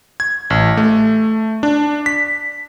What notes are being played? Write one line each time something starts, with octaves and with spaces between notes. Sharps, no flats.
G#6
A1
A3
D4
B6